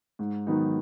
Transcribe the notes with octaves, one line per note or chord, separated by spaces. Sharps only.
G#2
D#3 F#3 B3 D#4